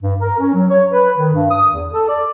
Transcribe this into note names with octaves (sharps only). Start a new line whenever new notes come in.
G2
A#4
C#4
F#3
C#5
B4
D#3
G2
D#6
E2
A4
D5